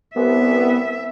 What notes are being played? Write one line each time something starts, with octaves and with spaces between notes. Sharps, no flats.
C2 B3 E5